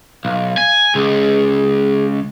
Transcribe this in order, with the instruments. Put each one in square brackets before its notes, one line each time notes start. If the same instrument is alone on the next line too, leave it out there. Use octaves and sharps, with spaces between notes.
[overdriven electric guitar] B1 [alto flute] F5
[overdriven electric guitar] G#5
[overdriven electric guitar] C#2 [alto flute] G#4